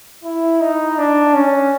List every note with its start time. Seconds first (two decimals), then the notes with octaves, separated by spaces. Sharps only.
0.24 E4
0.61 D#4
0.98 D4
1.34 C#4